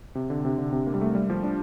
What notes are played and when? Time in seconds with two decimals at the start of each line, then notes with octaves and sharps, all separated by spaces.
0.15 C3
0.30 D3
0.45 C3
0.58 D3
0.72 C3
0.87 A#3
0.94 G3
1.01 A3
1.15 G3
1.30 F3
1.44 D4